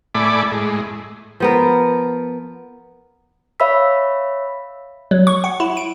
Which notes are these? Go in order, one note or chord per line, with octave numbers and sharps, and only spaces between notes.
A2 A3 D5 G#5 B5 D6
A2 G#3
F3 B3 A#4
C#5 E5 F5 B5 E6 B6
F#3
C#6
F#5
E4
D7